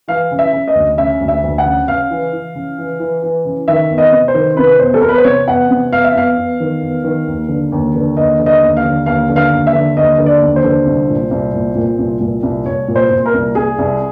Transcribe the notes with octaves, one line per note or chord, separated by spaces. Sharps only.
E3 F5
C#3
E5
C#3
D#5
D2
C#3 E5
D2
E5
D2
F#5
C#3
C#3 F5
E3
E3
C#3
E3
E3
E3
C#3
D#3 E5
E2
D#5
C3
C5
D#3
C3 B4
E2 C5
A4
E2 A#4
B4
C5
C3 C#5
E2 F#5
C3
E2 F5
E5
E2 F5
E2
D#3
E2
D#3
D#2
D3
D#2
D3
D#2 D#5
D3
D#5
D#2
F5
D3
D#2 F5
D3
F5
D#2
E5
D3
D#2 D#5
D3
D5
D#2
C5
D3
C2
A#2
C2
A#2
A#2
C2
A#2
C2
C2 C#5
A#2
C5
A#2
A#4
C2
C2 G#4
C2